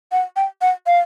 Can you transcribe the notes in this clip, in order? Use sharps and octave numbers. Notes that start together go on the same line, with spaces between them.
F#5
G5
F#5
F5